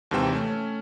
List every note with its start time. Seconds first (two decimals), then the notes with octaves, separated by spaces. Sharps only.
0.11 D#2 G#2 C3 E3 G5 E7
0.33 A3 C#4